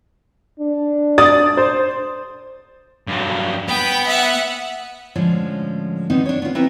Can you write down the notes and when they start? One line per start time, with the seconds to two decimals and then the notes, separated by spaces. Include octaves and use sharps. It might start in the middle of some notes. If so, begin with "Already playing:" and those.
0.60 D4
1.18 D5 D#6 A6
1.57 C5
3.08 G2 F#3
3.69 B3 G5 B5
4.07 E5 F#5
5.16 A2 D3 F3 G#3 C#4
6.10 D3 D#3 B3 C4 D#4
6.26 D4 C#5
6.42 B3 F4
6.55 B3 C4 D#4 E4 G4 B4